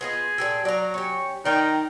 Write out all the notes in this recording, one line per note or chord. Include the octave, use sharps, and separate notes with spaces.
B3 F4 G#4 D#5
A#2 G4 A4
F#3 D5 A#5
C#4 G4 C#6
D#3 D#4 D5 G5